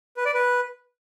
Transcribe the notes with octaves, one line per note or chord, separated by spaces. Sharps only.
B4
D5
B4